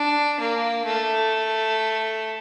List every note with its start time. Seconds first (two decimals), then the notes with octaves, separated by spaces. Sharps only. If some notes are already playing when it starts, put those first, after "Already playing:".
Already playing: D4
0.40 A#3
0.86 A3